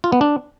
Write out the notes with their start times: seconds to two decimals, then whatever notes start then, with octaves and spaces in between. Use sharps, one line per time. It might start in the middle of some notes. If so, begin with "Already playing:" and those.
0.04 F4
0.12 B3
0.21 D4